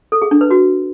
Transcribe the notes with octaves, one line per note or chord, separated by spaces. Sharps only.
A4
G#4
D4
B4
F#4